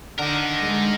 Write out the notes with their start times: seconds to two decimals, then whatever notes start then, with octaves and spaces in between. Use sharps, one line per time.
0.19 D3 D#4 A#4
0.60 G#3